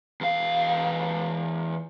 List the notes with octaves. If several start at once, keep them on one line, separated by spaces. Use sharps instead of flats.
E2 F5